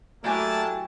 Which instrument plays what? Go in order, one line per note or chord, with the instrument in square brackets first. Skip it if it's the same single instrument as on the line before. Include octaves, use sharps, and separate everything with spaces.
[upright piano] F#3 [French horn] A3 [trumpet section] A#3 D4 A5 [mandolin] E4 G4 G#5